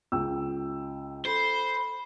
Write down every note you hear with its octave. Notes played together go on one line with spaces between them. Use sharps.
C#2 G5 E6
A4 C5 B5